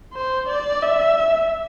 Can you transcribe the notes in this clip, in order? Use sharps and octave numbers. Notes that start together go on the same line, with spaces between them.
C5
D5
E5